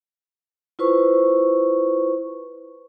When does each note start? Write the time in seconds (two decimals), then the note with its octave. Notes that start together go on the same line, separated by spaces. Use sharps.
0.79 E4 F4 B4 C5 C#6